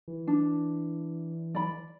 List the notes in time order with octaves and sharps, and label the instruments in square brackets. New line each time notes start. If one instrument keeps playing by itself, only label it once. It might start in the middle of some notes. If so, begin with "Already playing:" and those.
[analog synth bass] E3
[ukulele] D4
D5 B5